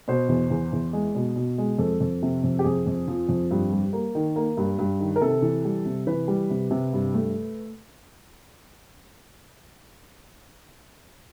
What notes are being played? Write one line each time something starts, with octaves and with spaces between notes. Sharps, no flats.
B2 C5
E2
E2
E2
G#3
B2
B2
G#3
F2 A4
F2
C3
F2
G4
F2 G#4
F2
F3
F2
G2
G3
A#3
D#3
A#3
G2
G2
D#3
A#4
C3 A4
E3
G3
C3
E3 B4
G3
C3
C3
G2
A3